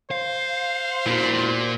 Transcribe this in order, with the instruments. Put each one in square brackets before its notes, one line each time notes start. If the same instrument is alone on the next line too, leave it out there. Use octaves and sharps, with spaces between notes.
[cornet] C5 [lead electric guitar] F5
[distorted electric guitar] A#2 [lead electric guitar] E4 F#4